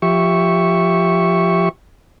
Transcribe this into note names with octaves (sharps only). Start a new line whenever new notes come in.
F3 G4 E5 C#6